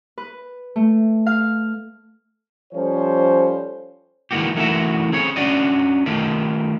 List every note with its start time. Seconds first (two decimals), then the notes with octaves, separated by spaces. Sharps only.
0.18 B4
0.76 A3
1.26 F5
2.74 F3 G3 C#4 A4 C5 C#5
4.31 D#3 E3 G#3 A#3 F#4 G4
4.56 E3 A3 D#4 F#4 A#4 E5
5.12 C4 G#4 C#5
5.36 C#4 D4 F#4 D5 D#5
6.06 D#3 A3 D#4 F4 G4